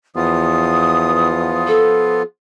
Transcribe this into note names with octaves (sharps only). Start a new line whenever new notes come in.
E2 F3 B3 F4 D#6
A4